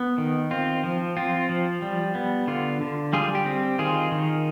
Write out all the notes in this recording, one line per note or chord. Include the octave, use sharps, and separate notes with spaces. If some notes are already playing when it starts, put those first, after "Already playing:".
Already playing: B3
D#3
C4 F4
F3
C4 F4
F3
G3
B3
D3 F4
D3
G3 F4 G#4
G4
C4
D#3 F4 G#4
D#3